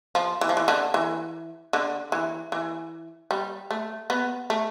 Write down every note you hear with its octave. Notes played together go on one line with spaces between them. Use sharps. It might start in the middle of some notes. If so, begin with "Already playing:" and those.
F3
E3
F3
E3
D3
E3
D3
E3
E3
G3
A3
B3
A3